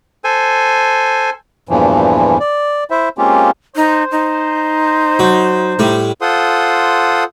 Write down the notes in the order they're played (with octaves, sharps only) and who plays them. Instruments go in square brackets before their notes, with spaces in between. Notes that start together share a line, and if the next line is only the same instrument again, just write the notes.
[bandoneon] A4 C5 G#5
E2 G2 A#2 E3 F3
D5
E4 C5 E5
G#3 A#3 C4 C#4 F4 G4
[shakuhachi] D#4 [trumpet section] C5
[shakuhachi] D#4
[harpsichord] F#3
A2 G3
[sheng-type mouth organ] F4 A4 C5 F#5 C6 D#6